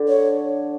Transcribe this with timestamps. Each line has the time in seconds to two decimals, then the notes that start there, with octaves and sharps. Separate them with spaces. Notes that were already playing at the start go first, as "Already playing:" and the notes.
Already playing: D3
0.08 C#5